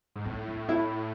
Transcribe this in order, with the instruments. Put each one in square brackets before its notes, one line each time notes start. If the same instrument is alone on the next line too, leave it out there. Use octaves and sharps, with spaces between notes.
[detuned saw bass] G#2
[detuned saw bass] A2 [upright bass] D#4
[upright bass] D4
E4